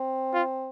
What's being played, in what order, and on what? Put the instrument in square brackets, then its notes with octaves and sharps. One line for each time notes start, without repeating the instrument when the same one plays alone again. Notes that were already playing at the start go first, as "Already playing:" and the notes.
Already playing: [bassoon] C4
[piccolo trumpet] F4